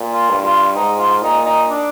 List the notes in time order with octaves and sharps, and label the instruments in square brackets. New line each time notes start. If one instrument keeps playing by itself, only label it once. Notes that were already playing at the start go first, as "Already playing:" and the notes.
Already playing: [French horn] A#2
[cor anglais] F4
[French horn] G2
[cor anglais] F4
[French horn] G#2 [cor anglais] D#4
[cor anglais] F4
[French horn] A#2 [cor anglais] D#4
[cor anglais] D#4
D4